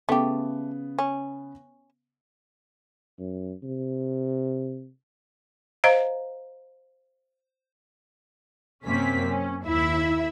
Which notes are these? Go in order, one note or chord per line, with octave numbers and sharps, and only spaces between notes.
C#3 A3 B3 G4
C#4
F#2
C3
C5 D#5 F5 A#5
F#2 C3 A#3 C4 C#4 B6
C#4
D#2 E4 E5 B5